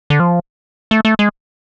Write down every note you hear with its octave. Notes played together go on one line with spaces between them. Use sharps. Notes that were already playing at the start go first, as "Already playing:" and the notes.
D3
F3
A3
A3
G#3